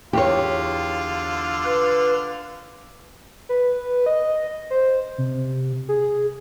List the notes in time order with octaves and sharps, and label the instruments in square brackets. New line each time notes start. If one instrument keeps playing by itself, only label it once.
[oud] E2 C#5 [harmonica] D3 F4 [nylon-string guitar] G4
[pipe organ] B4
[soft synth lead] B4
D#5
C5
C3
G#4